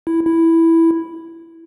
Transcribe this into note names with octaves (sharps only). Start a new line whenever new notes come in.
E4
E4